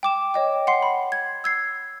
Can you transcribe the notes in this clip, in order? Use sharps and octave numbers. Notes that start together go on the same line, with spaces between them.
G5 D6 E7
C#5 D#5 G5
F#5 C6 C7
B5
G#6
E6 G#6 C7